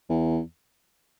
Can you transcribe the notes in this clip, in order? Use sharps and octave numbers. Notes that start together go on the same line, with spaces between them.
E2